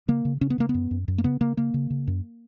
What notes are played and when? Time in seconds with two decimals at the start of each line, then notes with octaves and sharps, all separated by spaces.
0.08 C#3 A#3
0.25 C#3
0.41 C#3 C#4
0.50 B3
0.58 C#3 A#3
0.69 B3
0.74 F#2
0.91 F#2
1.08 F#2
1.18 A#3
1.24 C#3 B3
1.41 C#3 A#3
1.57 C#3 A#3
1.74 C#3
1.90 C#3
2.07 F#2